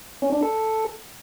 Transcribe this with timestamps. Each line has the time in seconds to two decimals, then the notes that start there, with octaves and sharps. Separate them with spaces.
0.22 C#4
0.32 D4
0.43 A4